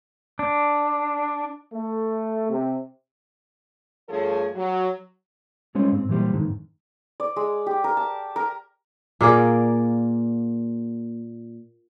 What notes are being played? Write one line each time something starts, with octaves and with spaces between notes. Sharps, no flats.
D4
A3
C3
G2 F3 A3 G#4 A4 C#5
F#3
G3 G#3 C#4 F4 C5 C#5
G#2 C4
A#2 E3 F#3 G3 G4 C5
F2 G#2 D3 D#3
D5
G#3
G4
A#4
A5
A#4
A#2 A#3 G#4 D5